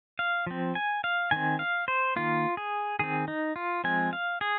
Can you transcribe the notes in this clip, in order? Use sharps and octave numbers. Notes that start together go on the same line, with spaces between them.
F5
F3 C4
G#5
F5
D#3 C4 G#5
F5
C5
D#3 A#3 F4
G#4
D#3 C4 G#4
D#4
F4
F3 G#3 C4 G#5
F5
G#4